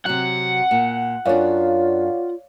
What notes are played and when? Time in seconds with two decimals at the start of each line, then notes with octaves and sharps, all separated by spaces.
0.06 C3 F#3 F#5
0.71 A#2
1.25 F#2 D4 F4 C#5 D5 F5